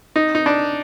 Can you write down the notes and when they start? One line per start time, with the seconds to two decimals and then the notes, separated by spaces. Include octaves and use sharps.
0.16 D#4
0.35 D#4
0.46 D4